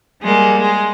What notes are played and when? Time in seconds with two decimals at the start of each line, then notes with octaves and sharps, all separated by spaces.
0.21 G3 G#3 A#3
0.59 G#3